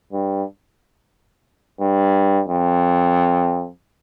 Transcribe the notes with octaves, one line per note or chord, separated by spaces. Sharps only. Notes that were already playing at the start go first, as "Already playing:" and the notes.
G2
G2
F2